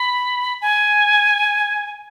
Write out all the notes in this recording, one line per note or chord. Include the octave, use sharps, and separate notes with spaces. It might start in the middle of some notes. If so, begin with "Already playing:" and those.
Already playing: B5
G#5